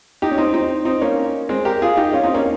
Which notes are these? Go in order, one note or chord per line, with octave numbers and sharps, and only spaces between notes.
D#4 G4
C#4
C4 D#4
C4 D#4
C4 D#4
A#3 C#4
G#3 C4
G4 A#4
F4 G#4
D#4 G4
C#4 F4
C4 D#4
A#3 C#4